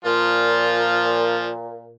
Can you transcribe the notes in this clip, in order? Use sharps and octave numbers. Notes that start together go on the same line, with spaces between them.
A#2 F3 F4